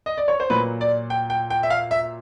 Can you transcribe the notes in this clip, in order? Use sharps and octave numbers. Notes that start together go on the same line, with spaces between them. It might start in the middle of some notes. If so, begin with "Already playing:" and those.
D#5
D5
C#5
C5
A#2 F#3 B4
D5
G5
G5
G5
E5
F5
E5